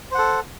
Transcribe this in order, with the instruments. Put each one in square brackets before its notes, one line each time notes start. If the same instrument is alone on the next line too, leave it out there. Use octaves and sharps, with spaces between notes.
[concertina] C5
F#5
A4